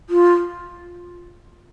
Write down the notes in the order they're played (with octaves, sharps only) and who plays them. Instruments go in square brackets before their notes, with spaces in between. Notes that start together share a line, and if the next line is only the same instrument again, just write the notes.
[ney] F4